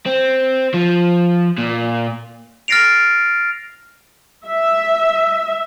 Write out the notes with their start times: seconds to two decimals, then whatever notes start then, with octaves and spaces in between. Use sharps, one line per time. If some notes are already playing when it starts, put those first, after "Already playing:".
0.06 C4
0.74 F3
1.58 A#2
2.68 F6 A6 A#6 C7 D7 F7
4.46 E5